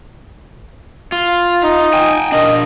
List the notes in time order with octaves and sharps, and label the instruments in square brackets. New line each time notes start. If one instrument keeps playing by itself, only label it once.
[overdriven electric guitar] F4
[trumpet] D#4
[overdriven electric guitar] G5 G#5
[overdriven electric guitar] D4 A#4 [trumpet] D#5